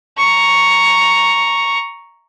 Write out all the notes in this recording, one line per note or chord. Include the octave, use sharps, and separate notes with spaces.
A#5 C#6